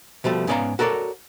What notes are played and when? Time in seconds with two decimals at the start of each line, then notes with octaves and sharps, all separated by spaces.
0.24 B2 F3 G3 A3
0.47 G#2 B3 C#4 D5 F5 A#5
0.79 F#4 A4 A#4 C#5 D5